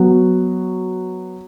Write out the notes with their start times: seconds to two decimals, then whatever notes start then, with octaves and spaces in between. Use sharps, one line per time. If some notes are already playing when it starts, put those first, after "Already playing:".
Already playing: F#3 B3 F#4